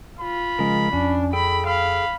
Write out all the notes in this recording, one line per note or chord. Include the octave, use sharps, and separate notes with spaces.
F4 B5
C#3 F3 G#3 A#4
F2 C#4 D4
G#4 A4 G5 B5
F5 B5